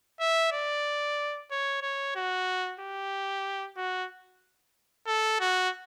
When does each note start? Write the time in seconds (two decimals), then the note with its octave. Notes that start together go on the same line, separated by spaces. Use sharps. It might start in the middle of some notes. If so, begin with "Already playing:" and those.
0.20 E5
0.52 D5
1.51 C#5
1.82 C#5
2.16 F#4
2.80 G4
3.77 F#4
5.07 A4
5.40 F#4